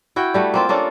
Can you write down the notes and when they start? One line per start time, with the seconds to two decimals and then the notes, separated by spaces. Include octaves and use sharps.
0.16 E4 F#4 G5
0.34 G3 A3 F#4
0.54 A#3 C4 F4
0.69 A#3 C#4 D4 A4